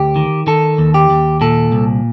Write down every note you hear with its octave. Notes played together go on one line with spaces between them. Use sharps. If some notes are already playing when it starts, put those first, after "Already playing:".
Already playing: D2 G4
D#3
D#3 A4
D#2
G4
D#2
A#2 A4
C2